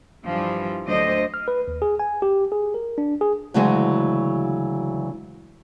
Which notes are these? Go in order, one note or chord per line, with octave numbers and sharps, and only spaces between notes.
G2 E3 F3 G3
D2 F#3 A3 D4 C5 D#5
F6
B4
D#2
G#4
G#5
G4
G#4
A#4
D4
G#4
D2 C#3 E3 F#3 G#3 C#4